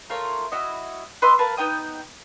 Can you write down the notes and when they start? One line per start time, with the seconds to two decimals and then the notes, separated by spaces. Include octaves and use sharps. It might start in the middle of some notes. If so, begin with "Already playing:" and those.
0.10 A3 F4 A#4 C#5
0.52 E4 F#4 D#5
1.22 B4 D#5 C6 E6
1.39 A#4 B4 F5 A5
1.57 B3 D#4 G5 D#6